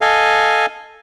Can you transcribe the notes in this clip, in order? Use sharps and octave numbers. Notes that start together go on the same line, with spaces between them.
A4 D#5 F5 G#5